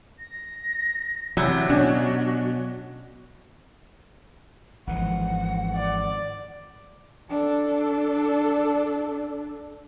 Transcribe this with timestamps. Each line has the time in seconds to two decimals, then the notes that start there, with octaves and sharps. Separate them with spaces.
0.19 A#6
1.37 C3 E3 F#3 F#4
1.69 B2 C#4 D4
4.87 G#1 E3 F3 F#5
5.75 D5
7.29 D4 A4